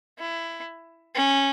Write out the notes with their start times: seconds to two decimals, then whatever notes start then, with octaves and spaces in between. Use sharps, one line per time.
0.19 E4
1.15 C#4